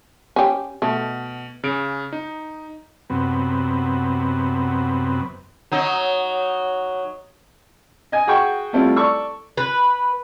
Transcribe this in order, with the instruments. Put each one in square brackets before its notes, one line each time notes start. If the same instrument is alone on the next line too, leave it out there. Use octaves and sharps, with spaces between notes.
[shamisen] C#4 G4
[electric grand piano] B2 [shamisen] A3
[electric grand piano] C#3 D7
D#4
[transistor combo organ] F#2 C3 B3
[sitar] F#3 D#4
[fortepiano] D#5 G#5
F#4 G#4 G5 C#6
G3 A3 C4 E4 F4
A4 D5 C#6 E6
[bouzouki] B4